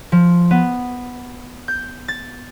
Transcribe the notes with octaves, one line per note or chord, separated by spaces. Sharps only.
F3
B3
G6
A6